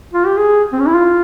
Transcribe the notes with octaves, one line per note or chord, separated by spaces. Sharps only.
F4
G4
G#4
C4
C#4
E4
F4